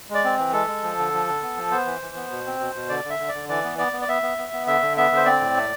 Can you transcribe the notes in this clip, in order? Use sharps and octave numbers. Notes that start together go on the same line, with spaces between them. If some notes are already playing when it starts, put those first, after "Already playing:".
G#3
D5
C4
E3
G#3 A4
G#3
F3
D3
F3
D3
B3
F3
B3 C5
E3
E3
B3
B2
C4
B2
B2
D3 D5
D3
E5
D3
D5
D3
E3 D5
B3
B3 D5
B3
D5
B3 E5
B3
B3
B3
D3 E5
D3
B3 E5
D3 C5
C4 D5
A2
A3